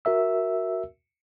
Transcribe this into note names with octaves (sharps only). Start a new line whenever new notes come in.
F#4 A#4 E5 E6